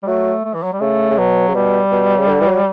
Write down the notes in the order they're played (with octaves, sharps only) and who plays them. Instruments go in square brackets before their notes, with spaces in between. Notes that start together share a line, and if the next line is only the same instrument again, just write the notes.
[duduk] G3
[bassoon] F#3 [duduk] A3
[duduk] A3
E3
F#3
G3
[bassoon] C#3 [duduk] A3
[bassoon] C#3
[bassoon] B2 [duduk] F#3
[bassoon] C#3
[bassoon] B2 [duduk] G3
[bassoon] B2
C#3
D3
E3
F#3